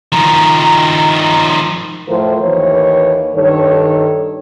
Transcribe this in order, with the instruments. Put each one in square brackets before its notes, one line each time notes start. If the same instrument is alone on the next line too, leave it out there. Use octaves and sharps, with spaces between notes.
[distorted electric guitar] D#3 F3 [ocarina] A#5
[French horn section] A2 F3 F4 A#4 C5
D#2 E3 B4 C#5
G2 D#3 A4 C#5